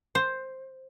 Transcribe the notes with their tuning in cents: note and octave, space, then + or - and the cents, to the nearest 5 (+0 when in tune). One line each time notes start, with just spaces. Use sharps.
C5 +5